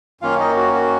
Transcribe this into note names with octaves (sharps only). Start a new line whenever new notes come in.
F#2 D#3 A#3 C#4 F4 F5
D#4 D#5
F#4
F#4